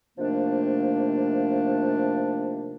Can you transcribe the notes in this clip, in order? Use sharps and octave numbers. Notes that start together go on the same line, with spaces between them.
C3 D#3 F3 A3 A#3 D4